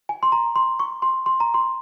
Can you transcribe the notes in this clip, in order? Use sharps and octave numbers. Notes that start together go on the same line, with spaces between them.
G#5
C6
A#5
C6
C#6
C6
C6
A#5
C6